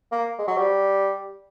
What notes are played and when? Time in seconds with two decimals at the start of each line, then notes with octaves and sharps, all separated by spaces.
0.12 A#3
0.39 G#3
0.47 F#3
0.57 G3